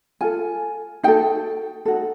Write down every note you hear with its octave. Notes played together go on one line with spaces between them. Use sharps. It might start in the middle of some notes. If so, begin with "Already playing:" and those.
F4 A4 G#5
D#4 F#4 A4 G5
D#4 F#4 A4